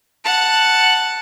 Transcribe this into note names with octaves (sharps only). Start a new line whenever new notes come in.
F#5 A5